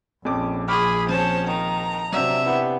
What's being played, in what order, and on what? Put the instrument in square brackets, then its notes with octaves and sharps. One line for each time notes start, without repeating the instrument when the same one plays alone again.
[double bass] A#1 [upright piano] F2 C#4 D6
[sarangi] G#4 [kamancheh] B5 [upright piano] C#6 D6 F6
[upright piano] F3 C4 [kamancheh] C#4 C5 [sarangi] A5
[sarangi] D#3 [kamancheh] A#5
[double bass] C3 D4 [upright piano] F#3 C4 [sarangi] E5
[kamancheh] B3 [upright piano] E4 G4